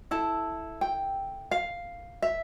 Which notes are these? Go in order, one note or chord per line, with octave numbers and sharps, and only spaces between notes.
E4 A4 A5
G5
F5
E5